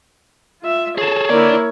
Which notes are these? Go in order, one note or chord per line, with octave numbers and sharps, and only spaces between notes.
F4 E5
G#4 A4 C#5
D3 A#3 E4 D5